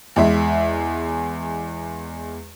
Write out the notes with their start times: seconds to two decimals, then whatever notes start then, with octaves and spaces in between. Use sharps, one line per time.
0.16 E2 G#3 E5